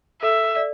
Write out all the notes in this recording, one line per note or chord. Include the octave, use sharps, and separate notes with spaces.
A4 E5
D5